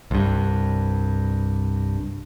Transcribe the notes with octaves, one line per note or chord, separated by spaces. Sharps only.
C2 G2